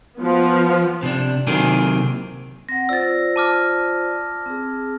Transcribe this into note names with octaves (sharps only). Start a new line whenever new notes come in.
F3 B3
C3 D4
C3 D#3 F#3 A#3 C4 G#4
C4 F#5 A#6
F4 C5 D5 E6 A6
A5 D6 F6
C4 G#4